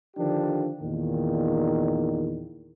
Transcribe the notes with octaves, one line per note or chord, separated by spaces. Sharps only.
D3 D#3 F3 D4 G4
E2 A#2 D#3